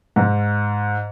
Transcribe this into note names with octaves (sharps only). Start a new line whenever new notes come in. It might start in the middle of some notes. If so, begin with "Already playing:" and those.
G#2